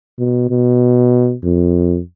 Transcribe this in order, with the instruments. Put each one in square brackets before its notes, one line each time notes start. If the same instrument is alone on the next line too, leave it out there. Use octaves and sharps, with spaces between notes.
[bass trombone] B2
B2
F2